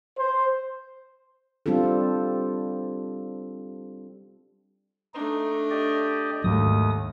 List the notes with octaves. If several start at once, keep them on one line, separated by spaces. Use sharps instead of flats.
C5
G3 C4 D4 F4 A4
A3 D4 D#4
G4 D5 D#5
D#2 G#2 D#3 F#3 A3 D#6